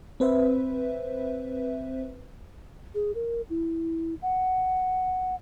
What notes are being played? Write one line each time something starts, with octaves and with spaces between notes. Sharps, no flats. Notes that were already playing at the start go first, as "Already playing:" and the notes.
C4 B4 C5 E5
G#4
A#4
E4
F#5